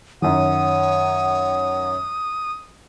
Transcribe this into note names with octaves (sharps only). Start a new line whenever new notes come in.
F#2 D#3 C#5 F#5 D#6